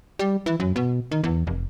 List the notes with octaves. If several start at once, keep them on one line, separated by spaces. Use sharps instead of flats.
G3
E3
F#2
B2
D#3
E2
F1